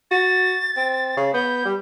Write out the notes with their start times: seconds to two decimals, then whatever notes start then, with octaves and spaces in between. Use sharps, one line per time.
0.11 F#4 A6
0.77 C4
1.17 C#3
1.34 B3 G6
1.65 G3